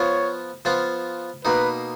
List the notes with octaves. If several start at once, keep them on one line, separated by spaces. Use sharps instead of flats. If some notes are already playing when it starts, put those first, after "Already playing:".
Already playing: F3 B3 F4 C#5
F3 B3 F4
B2 A#3 D#4 B4